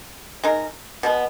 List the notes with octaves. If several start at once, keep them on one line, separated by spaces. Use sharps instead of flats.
G#3 D#4 A#4
B2 G#3 B3